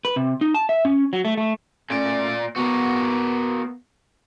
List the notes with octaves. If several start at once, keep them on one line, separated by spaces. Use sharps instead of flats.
B4
C3
D#4
A5
E5
C#4
F#3
A3
A3
A#2 A3 C#4 D5
A#3 B3 F#4